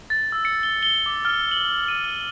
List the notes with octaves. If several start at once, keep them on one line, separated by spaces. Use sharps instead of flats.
A6
E6
C#7
G7
G7
D6
F6
F#7
D#7